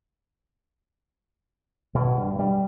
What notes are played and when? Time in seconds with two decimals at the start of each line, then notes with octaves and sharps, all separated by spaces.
1.95 B2
2.17 G2
2.39 G3